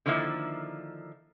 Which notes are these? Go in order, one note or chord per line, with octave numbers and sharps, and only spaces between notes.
D3 D#3 F3 A#3 E4